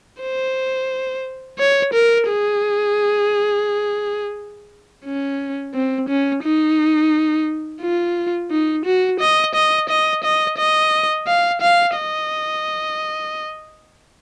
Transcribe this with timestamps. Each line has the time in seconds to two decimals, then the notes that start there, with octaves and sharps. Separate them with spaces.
0.21 C5
1.59 C#5
1.93 A#4
2.29 G#4
5.05 C#4
5.74 C4
6.09 C#4
6.43 D#4
7.81 F4
8.51 D#4
8.85 F#4
9.20 D#5
9.55 D#5
9.89 D#5
10.24 D#5
10.58 D#5
11.27 F5
11.61 F5
11.96 D#5